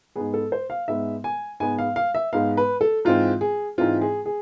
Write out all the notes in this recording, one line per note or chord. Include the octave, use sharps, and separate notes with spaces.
G#2 G#3 B3 G#4
A4
C5
F5
G#2 G#3 B3 E5
G#5
G#2 G#3 B3 G#5
F5
F5
E5
G#2 G#3 B3 F5
B4
A4
G#2 E3 G#3 C4 F4
G#4
G#2 E3 G#3 C4 F4
G#4
G#4